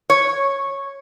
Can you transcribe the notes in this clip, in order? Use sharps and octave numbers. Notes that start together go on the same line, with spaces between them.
C#5